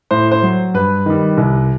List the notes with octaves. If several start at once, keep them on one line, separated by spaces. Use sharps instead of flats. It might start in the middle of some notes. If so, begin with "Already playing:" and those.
A2 C5
C5
F#3
G2 B4
D#3 G3
C2